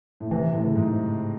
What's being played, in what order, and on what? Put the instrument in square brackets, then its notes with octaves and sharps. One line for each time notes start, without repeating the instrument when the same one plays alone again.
[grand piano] A2
[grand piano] C3 [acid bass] E3
[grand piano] A2
[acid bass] C#3
[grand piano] G#2